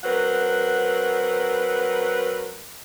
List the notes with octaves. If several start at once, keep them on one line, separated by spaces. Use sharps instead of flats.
F#3 C4 A#4 B4 F#5